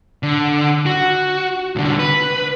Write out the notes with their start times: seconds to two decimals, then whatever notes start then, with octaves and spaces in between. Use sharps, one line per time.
0.23 D3
0.86 F#4
1.76 C2 D3
1.99 B4